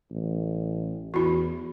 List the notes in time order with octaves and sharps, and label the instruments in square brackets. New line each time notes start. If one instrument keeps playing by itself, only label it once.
[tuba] A1
[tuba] E2 [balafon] E4 F#4